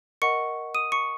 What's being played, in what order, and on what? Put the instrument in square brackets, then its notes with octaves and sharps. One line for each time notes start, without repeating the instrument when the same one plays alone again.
[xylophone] A#4 D#5 F#5 C#6 C#7
D#6 D#7
C#6 C#7